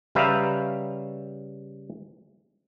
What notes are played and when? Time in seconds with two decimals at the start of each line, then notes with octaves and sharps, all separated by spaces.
0.15 C#3 G3 B4 E5 F5 A#5